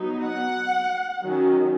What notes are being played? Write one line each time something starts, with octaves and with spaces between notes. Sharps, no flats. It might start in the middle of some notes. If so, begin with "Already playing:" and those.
Already playing: F#3 B3 D#4
F#5
D#3 F#3 C#4